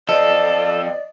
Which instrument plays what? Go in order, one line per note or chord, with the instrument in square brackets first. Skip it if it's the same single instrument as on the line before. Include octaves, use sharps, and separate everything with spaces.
[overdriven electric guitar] F3 C4 [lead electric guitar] A4 [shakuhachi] D5 [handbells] D#5